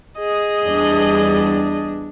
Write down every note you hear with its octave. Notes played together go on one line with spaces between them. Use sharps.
G#4 D#5
E2 G3 D4